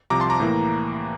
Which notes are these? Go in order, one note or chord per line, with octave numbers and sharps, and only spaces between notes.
C2 C3 F3 A#5 D6
A5 C6
A#5 D6
A2 E3 A#3